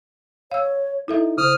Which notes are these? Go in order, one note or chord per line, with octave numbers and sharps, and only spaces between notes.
C#5 F5 E6
D#4 E4 A4 E5
C#3 C5 D#6 F6